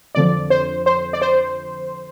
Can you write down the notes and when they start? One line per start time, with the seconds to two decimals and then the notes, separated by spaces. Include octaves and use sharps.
0.15 F2 D3 F3 D5
0.50 C5
0.86 C5
1.13 D5
1.22 C5